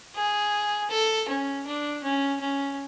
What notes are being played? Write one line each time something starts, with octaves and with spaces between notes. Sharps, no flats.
G#4
A4
C#4
D4
C#4
C#4